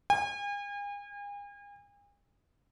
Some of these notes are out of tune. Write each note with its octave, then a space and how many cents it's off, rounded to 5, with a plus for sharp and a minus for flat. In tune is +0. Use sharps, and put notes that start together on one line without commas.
G#5 -40